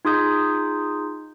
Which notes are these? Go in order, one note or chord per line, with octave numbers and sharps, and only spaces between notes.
D#4 F4 G#4 D#6 G6